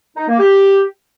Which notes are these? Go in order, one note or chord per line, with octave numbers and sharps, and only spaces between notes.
D#4
A#3
G4